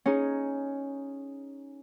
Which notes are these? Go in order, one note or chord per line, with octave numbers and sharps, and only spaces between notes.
C#4 D#4 G#4